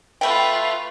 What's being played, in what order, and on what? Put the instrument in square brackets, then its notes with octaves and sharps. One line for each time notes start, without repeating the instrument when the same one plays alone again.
[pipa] B2 A3 G5 [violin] F4 B4